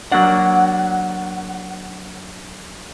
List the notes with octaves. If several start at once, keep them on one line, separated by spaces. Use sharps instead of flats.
F#3 A#3 D4 F#5